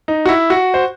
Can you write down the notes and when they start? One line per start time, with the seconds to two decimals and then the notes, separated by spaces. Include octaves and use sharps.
0.08 D#4
0.26 F#4
0.29 E4
0.50 F#4
0.74 C5